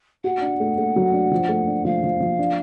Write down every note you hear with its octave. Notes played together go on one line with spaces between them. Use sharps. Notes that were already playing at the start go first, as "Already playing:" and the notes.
F#4 F#5
D4
A3
A3
F#3
D4
F3
A3
D4
F3 F5
F3
F3
D4